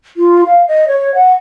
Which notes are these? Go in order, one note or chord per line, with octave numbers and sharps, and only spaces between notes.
F4
F5
D#5
C#5
F#5